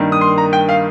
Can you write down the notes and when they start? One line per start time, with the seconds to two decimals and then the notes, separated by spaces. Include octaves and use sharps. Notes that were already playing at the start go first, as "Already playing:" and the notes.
Already playing: G2 D#3 A#3
0.12 D#6
0.21 C6
0.38 A#5
0.53 G5
0.69 F5